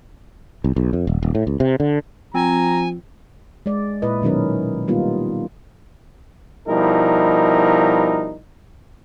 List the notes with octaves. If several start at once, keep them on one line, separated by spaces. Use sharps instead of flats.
C2
B1
F2
D#1
D#1
A2
C#2
C3
D3
F3 C4 G#5 A#5
G#3 D5
A#2 E4 B4 D#5
B2 D#3 F#3 C#4 A#4
D#3 G3 A#3 B3 D#4 F4
B2 F3 G3 D#4 E4 A#4